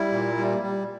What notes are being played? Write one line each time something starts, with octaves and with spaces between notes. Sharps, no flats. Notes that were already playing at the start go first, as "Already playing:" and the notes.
Already playing: G3 E4
A#2
G3
G3